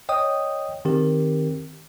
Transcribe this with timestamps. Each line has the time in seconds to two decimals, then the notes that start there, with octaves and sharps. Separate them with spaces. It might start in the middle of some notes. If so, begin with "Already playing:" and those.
0.09 C#5 D#5 G5 D#6
0.85 D#3 C4 G4 A#4